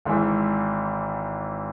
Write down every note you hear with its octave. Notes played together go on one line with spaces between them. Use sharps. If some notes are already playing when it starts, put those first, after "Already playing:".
G#1 G#2 E3